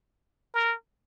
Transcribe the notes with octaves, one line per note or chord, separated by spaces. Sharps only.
A#4